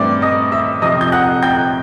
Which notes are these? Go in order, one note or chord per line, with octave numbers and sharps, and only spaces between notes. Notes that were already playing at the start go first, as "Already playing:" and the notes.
Already playing: G2 E3 A3 C4 D5 D6
D#5 D#6
E5 E6
F2 C3 F3 D#5 D#6
G6
F#5 F#6
G5 G6